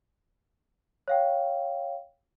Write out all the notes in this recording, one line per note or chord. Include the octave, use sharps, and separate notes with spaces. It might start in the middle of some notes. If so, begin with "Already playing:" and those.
C#5 F5 G5